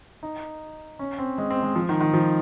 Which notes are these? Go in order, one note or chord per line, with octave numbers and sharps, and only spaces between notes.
D#4
C#4
C4
G#3
C4
G#3
F3
D#3
D#3
F3